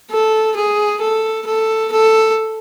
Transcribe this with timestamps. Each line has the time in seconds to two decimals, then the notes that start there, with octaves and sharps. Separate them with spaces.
0.11 A4
0.56 G#4
1.01 A4
1.47 A4
1.92 A4